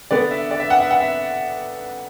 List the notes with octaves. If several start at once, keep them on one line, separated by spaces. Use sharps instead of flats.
D3 B3 D4 D5
E5
D5
E5
F#5
E5
F#5
E5